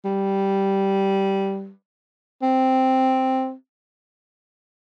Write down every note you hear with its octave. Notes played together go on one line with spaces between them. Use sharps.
G3
C4